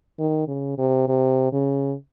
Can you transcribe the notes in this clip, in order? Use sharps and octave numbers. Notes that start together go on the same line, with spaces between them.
D#3
C#3
C3
C3
C#3